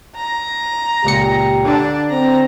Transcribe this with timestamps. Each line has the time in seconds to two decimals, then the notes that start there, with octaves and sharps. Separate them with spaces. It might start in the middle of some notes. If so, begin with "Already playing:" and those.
0.16 A#5
1.04 C#2 A#2 G4 C#7
1.65 D3 D4
2.11 C4 A#5